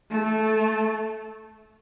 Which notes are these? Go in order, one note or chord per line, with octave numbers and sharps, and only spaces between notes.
A3